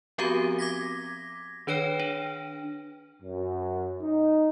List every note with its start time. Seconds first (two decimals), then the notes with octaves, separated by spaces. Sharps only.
0.18 F3 B3 C4 F#4 G4 A#5
0.59 D6 G#6 A#6 B6
1.67 D#3 D4 B4 C#5 G5
2.00 D4
3.22 F#2
4.02 D#4